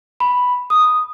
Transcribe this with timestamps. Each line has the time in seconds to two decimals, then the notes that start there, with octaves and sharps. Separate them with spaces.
0.20 B5
0.70 D#6